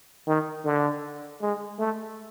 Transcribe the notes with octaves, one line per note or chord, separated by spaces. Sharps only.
D#3
D3
G#3
A3